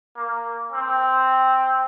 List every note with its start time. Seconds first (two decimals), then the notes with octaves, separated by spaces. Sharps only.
0.17 A#3
0.72 C4